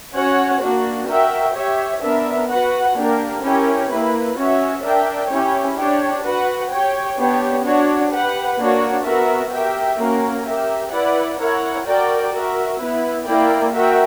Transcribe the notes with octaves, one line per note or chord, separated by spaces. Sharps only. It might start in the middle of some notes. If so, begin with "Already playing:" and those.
C#4 F#4 C#5 F#5
A#3 D4 F#4
F#4 A#4 E5 G5
G4 C#5 E5
B3 D4 A#4 E5
F#4 B4 F#5
A#3 D4 G4 A#4
C#4 E4 G4 A#4 C#5
A#3 E4 B4
C#4 F#4 C#5 E5
D4 A#4 E5 G5
C#4 E4 G4 C#5
D4 G4 C#5
F#4 B4 F#5
G4 C#5 G5
B3 D4 G4 C#5
D4 F#4 C#5
G4 B4 F#5
A#3 D4 F#4 C#5
B3 F#4 A#4 E5
G4 A#4 E5 G5
A#3 C#4 F#4 A#4
G4 A#4 E5
E4 B4 D5 F#5
E4 A#4 C#5 F#5
F#4 A#4 D5 G5
F#4 A#4 E5
B3 E4 B4
A#3 E4 A#4 D5 G5
F#4 A#4 E5 G5